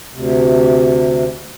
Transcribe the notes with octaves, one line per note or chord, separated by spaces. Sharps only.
D2 C3